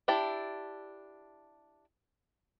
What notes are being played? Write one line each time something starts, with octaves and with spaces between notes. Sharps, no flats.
D4 E4 G4 D5 A5